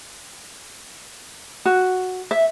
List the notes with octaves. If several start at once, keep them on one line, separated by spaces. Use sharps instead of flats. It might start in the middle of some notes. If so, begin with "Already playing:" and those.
F#4
E5